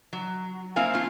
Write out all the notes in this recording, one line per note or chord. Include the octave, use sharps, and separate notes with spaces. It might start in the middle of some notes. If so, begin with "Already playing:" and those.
F#3
A#3 C4 E4 F5 G#5
A3 F4